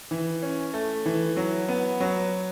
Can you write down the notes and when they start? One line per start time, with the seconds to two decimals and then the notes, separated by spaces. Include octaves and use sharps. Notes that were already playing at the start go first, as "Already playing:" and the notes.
0.11 E3
0.42 C#4
0.74 A3
1.05 E3
1.36 F#3
1.68 B3
2.00 F#3